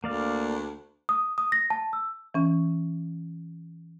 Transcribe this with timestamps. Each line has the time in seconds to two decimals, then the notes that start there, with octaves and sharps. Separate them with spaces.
0.04 D2 A#3 D5 F5
1.09 D#6
1.38 D#6
1.52 A#6
1.70 A5
1.93 E6
2.34 E3 C#4